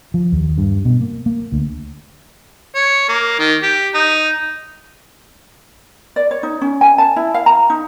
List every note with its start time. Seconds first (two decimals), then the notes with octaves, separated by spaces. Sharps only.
0.14 F3
0.32 D#2
0.58 G2
0.85 B2
1.01 A#3
1.26 A#3
1.52 D2
2.75 C#5
3.09 A#3
3.39 D#3
3.63 G4
3.94 D#4
6.16 D5
6.31 C#5
6.43 D#4
6.61 C#4
6.81 G#5
6.98 A5
7.16 E4
7.34 F5
7.46 A#5
7.70 D#4